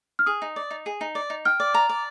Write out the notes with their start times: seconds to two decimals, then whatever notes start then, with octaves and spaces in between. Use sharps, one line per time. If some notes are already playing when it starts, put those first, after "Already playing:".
0.19 F6
0.26 G#4 D#6
0.42 D#4
0.56 D5
0.71 D#4
0.86 G#4
1.01 D#4
1.15 D5
1.30 D#4
1.45 G5 F6
1.60 D5
1.74 A#5
1.89 D5